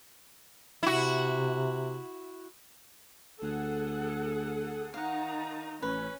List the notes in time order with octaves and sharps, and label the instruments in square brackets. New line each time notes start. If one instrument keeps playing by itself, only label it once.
[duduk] C3 [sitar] E4 F#4
[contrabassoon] D2 [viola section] G#4 A4 F#5
[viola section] D#3 D#4 A#5 [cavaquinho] F5 F#5
[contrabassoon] A1 [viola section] C#4 [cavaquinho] B4